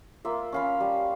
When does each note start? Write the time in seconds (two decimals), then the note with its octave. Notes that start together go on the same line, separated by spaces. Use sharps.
0.25 A#3 F4 E5
0.52 C#4 F5 B5
0.80 G3